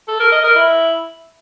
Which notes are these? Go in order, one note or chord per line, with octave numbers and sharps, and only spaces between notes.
A4
A#4
D#5
A#4
E4